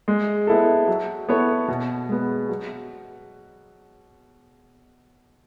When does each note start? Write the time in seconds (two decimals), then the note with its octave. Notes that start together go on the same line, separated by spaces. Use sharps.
0.08 G#3
0.47 B3 E4 A4
0.88 F#3
1.29 B3 E4 A4 C#5
1.68 B2
2.09 G#3 B3
2.49 F#3